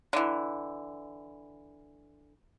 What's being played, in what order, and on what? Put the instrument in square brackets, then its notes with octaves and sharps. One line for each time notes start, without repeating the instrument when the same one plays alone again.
[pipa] D3 E3